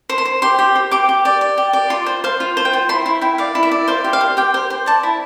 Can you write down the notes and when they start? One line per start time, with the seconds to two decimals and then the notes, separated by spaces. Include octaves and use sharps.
0.09 C5
0.18 C6
0.25 C5
0.42 G4 C6
0.59 G4
0.75 C5
0.91 G4 D6
1.09 G4
1.25 D5
1.41 D5
1.58 G4
1.73 D5
1.90 F4 C6
2.06 C5
2.24 C5 F5
2.40 F4
2.57 C5
2.65 G5
2.73 F4
2.89 E4 C6
3.06 E4
3.21 E4 G5
3.38 D5 F5
3.55 E4
3.63 E5
3.71 D5
3.88 C5 F5
4.04 G4
4.13 F5
4.21 C5
4.37 G4 G5
4.54 C5
4.70 C5
4.86 D5 A5
5.03 E4